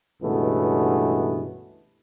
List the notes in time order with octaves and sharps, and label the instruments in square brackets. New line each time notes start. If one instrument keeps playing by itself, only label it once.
[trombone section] C#2 G2 B2 E3 A3 B3